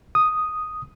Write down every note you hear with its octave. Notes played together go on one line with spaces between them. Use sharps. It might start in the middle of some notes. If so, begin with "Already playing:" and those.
D#6